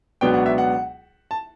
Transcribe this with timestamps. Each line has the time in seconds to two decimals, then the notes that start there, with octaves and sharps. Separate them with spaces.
0.21 C#2 B2 F#3 B3 D4 G5
0.34 F#5
0.46 E5
0.58 F#5
1.31 A5